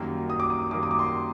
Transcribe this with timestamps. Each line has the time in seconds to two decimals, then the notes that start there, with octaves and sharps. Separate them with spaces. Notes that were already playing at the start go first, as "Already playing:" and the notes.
Already playing: F#2 D#3 G3 A#3
0.30 D#6
0.40 D6
0.50 D#6
0.71 F#2 D#3 G3 A#3 D6
0.83 D#6
0.91 D6
0.99 C6